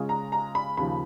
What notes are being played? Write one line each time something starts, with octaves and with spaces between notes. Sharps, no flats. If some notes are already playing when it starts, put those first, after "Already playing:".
Already playing: C#3 G#3 C#4 F4
A#5
A#5
B5
D#2 C#3 F3 B5